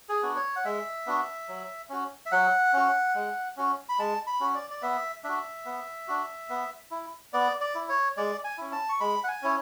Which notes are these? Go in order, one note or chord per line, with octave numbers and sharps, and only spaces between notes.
G#4
B3 D4 F#4
C#5
F#5
G#3 E5
B3 D4 F#4
F#3
C#4 F#4
E5
F#3 F#5
C#4 F#4
G#3
C#4 F#4
B5
G#3 A5
B5
C#4 F#4
D5
D5
B3 E5
D4 F#4 E5
B3
D4 F#4
B3
E4
B3 D5
D5
E4
C#5
G#3 D5
G#5
C#4 E4
A5
C#6
G#3 B5
F#5
G#5
C#4 E4 C#5